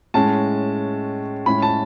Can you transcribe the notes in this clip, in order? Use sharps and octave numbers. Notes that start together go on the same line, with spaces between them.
A2 G#3 C#4 A5
A2 G#3 C#4 B5
A5